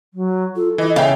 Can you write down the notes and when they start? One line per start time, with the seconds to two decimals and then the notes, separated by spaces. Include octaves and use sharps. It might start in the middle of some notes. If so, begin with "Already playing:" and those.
0.14 F#3
0.56 F4 A4
0.78 E3 D#5
0.96 C#3 E5 F5 G5